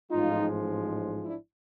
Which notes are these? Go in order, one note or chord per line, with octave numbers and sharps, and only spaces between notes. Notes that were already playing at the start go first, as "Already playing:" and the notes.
A1 G#2 F3 G#3 D#4 F4
D4 E4